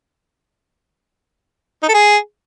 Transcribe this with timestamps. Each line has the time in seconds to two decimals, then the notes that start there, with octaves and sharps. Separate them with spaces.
1.83 D#4
1.88 A4
1.94 G#4